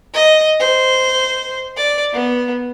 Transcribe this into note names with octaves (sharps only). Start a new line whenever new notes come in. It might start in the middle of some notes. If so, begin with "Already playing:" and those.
D#5
C5
D5
B3